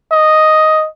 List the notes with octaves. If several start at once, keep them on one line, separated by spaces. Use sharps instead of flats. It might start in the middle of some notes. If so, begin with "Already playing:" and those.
D#5